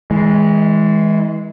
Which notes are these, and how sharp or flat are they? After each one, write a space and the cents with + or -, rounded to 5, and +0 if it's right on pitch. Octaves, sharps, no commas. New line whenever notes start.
E3 -30 G#3 +0